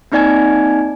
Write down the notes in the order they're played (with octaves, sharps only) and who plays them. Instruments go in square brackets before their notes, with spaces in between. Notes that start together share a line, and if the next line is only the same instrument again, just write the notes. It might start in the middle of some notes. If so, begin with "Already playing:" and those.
[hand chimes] A#3 C4 D#4 D5 G#5 G#6